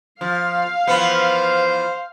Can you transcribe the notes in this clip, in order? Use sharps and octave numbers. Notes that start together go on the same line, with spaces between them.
F3 F5
E3 F3 B3 C5